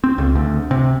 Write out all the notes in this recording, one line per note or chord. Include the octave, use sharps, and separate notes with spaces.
C4
C#2
D2
C3